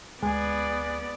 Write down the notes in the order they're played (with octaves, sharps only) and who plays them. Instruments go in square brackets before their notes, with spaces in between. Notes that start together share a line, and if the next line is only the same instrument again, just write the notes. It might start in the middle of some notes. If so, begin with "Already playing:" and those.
[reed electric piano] D2 G#5 [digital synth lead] G#3 [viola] B3 D5 [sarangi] G#4